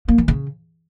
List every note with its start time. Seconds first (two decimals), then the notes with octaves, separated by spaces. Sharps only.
0.08 A#3
0.18 E3
0.28 C#3